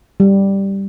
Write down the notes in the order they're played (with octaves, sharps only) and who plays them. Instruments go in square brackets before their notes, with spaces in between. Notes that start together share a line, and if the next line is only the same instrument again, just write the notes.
[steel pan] G3